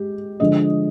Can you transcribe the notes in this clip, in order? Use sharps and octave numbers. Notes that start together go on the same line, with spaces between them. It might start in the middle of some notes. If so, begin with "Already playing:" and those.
Already playing: G#3 G4
D3 F3 G#3 D4 D#5